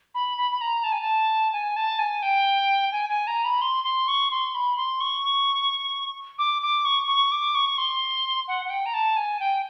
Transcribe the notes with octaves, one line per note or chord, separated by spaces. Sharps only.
B5
B5
B5
A#5
A5
G#5
A5
G#5
A5
G#5
G5
G#5
G#5
A#5
B5
C6
C6
C#6
C6
B5
C6
C#6
D6
D6
C#6
C#6
D6
C#6
C6
F#5
F#5
G5
A#5
A5
G#5
G5